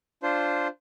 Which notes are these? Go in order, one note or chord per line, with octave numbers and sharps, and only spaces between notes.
D4 F4 C5